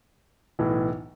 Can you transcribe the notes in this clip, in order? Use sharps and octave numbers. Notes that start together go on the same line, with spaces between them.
B1 A2 E3